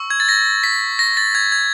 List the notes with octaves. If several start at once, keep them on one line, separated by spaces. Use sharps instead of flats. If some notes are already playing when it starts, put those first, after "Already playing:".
Already playing: C#6 E6
G#6
A6
A#6
B6
A#6
A6
G#6
G#6